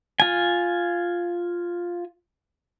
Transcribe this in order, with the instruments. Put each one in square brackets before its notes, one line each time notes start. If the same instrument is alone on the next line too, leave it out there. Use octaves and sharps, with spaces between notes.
[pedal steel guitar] F4 G#5